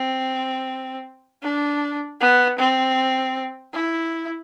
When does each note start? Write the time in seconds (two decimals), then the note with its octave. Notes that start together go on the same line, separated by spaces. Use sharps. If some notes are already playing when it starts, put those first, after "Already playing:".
Already playing: C4
1.42 D4
2.20 B3
2.58 C4
3.74 E4